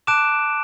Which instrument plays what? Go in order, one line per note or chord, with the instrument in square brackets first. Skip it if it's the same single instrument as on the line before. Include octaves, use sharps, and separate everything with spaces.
[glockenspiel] A5 D6 F#6 D7 E7